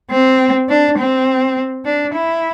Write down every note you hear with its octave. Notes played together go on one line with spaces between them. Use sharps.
C4
D4
C4
D4
E4